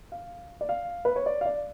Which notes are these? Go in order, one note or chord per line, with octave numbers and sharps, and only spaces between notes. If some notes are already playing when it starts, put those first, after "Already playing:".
F5
D5
F5
B4
C#5
D5
F5
D5